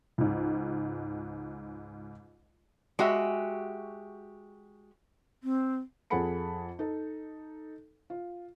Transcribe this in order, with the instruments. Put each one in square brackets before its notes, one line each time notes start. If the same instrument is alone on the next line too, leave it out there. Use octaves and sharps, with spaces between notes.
[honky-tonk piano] C#2 G#2
[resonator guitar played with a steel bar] G#3 F#4 G4 E5
[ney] C4
[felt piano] F2 G#4 A4 F#5 B5 C#7
D#4 A4
F4